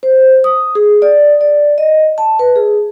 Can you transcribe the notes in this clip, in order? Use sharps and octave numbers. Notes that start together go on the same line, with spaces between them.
C5
D#6
G#4
D5
D5
D#5
A5
B4
G#4